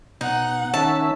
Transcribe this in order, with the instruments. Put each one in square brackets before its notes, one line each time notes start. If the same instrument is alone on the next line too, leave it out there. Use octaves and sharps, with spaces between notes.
[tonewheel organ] B2 [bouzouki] D#4 [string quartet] F#5
[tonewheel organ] D#3 C#4 E5 [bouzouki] A5